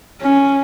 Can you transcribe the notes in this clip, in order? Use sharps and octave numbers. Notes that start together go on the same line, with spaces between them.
C#4